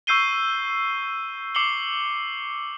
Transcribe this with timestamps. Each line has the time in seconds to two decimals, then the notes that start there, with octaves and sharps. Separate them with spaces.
0.07 C#6 E6 G6 C7 D#7 G7
1.55 D6 C7 C#7 F#7 G7